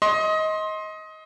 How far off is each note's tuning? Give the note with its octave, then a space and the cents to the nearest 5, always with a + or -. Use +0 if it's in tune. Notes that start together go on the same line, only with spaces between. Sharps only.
D#5 +20 C6 +15